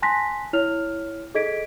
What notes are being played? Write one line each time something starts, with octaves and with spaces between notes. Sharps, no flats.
G#5 A5 C6 F#6 A#6 B6
E4 C#5 F6 F7
G#4 A4 D#5 G#6 B6 D7